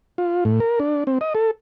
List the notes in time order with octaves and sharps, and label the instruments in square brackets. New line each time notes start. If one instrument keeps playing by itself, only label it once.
[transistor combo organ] F4
A2
A#4
D4
C4
D#5
A4